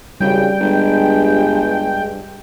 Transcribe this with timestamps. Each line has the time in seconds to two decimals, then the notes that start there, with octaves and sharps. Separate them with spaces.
0.21 G#1 C#3 G3 G5
0.60 G1 G2 G#3